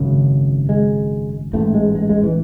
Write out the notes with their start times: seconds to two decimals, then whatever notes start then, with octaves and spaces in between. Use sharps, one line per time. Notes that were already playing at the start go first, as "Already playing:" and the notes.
Already playing: G#1 F#2 C#3
0.69 G#3
1.53 A1 G#2 A3
1.74 G#3
1.95 G#3
2.09 G#3
2.24 E3